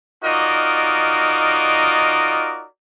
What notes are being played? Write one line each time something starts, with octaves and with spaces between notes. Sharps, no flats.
D#4 F4 F#4 A#4 D5 D#5